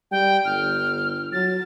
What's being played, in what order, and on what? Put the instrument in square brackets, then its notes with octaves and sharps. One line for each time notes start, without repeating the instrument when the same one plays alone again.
[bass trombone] G3 [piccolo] G5
[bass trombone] G1 [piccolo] F6
[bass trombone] F#3 [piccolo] A6